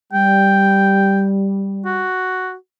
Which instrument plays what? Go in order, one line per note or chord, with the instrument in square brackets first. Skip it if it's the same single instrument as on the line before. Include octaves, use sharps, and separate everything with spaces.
[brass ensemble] G3 [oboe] G5
[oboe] F#4